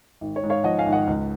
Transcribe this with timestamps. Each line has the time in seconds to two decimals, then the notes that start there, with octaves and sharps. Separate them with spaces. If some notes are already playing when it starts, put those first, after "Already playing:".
0.21 G#1
0.36 C#5
0.43 G#2
0.50 C#5 F5
0.64 F3 D#5 F#5
0.79 F5 G#5
0.86 G#1
0.93 D#5 F#5
1.07 C#2